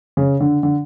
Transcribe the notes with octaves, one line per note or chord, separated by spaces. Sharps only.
C#3
D3
D3